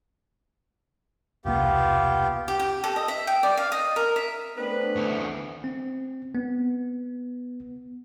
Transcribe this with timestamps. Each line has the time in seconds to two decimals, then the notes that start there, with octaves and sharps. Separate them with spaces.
1.45 E1 C2 A#3 B3 F4 G4
2.48 G4
2.59 G4
2.84 A4
2.96 D#5
3.08 E5
3.27 G5
3.43 D5
3.57 F5
3.72 D#5
3.96 A#4
4.16 E5
4.57 A3 B3 C4 D4 B4
4.96 D2 E3
5.64 C4
6.35 B3